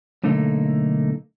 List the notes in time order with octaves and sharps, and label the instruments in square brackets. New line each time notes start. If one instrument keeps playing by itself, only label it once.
[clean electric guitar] B1 D3 A3 A#3 D#4